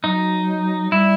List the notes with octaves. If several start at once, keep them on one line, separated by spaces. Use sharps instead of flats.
F#3 D#4
G3 E4